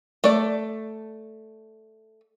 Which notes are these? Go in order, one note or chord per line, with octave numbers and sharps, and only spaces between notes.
A3 D5